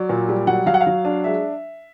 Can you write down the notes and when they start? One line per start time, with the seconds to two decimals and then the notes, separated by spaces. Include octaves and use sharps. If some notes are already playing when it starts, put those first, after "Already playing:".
Already playing: F#3 D5
0.09 A#2
0.29 G3
0.47 F#3 F#5
0.66 F#3 F5
0.74 F#5
0.81 F5
0.87 F#3
1.05 D4
1.24 G#3 E5